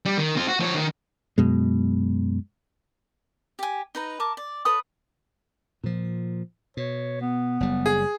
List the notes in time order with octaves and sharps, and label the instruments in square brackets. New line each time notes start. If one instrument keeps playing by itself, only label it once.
[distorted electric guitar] G3
D#3
C4 F4
F#4
F3 C#5
D#3
[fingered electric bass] F#2 B2 G#3
[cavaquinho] G4 G#5
D#4 B4 A#5
A#4 A5 D6
D5
A4 B4 C#5 D#6
[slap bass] A#2 F3
[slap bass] B2 [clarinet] C#5
[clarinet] B3
[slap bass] F#1 G3
[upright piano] G#4